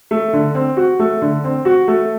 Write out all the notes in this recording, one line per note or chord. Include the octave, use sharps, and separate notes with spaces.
A3
D3
C4
F#4
A3
D3
C4
F#4
A3